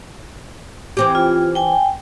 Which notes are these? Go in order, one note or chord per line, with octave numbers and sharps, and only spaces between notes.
E3 C4 G4 D6
F4
G5 G#5